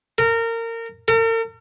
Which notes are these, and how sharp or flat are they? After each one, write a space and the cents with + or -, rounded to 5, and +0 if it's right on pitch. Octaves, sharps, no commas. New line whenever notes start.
A#4 -25
A#4 -45